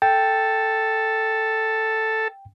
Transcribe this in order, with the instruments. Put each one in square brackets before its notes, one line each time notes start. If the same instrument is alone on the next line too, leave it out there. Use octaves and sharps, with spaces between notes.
[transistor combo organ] A4 [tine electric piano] G5